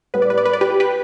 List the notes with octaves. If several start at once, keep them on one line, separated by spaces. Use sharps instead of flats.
A2 G3 B3 B4
D5
B4
D5
B4
D5
G4 B4
G4 B4